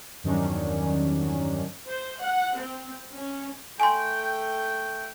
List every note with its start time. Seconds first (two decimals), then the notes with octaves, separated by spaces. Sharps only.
0.23 E2 G2 D#3 F#3 C#4 D4
1.87 C5
2.19 F#5
2.55 C4
3.12 C#4
3.80 A3 A4 G5 G#5 C6